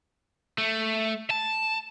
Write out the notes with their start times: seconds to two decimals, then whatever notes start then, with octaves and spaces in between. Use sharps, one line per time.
0.58 A3
1.30 A5